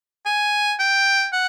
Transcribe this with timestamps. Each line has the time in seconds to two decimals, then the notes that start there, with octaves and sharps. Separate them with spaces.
0.26 G#5
0.80 G5
1.33 F#5